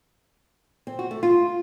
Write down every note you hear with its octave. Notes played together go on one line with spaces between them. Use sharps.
C4
F#4
A3
F4